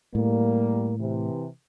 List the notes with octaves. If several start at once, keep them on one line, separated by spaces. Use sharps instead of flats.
A2 G3 A#3
C3 E3